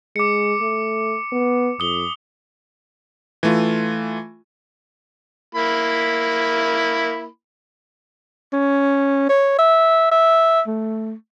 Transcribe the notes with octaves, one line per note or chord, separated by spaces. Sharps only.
G#3 D6 C#7
A3
B3
F2 D#6 G7
E3 A3 F4
A#3 E4 B5
C#4
C#5
E5
E5
A3